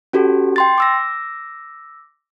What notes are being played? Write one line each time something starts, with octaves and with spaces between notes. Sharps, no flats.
C#4 F#4 G4 A4
G5 C6 A6
D6 E6 A#6